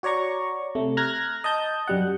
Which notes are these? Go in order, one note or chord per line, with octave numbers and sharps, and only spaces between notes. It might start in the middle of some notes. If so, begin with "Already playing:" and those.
F#4 C#5 D5 A#5 C#6
C3 A3
A#5 F6 F#6 G#6 A#6
D#5 A5 G6
F#2 G3 F#5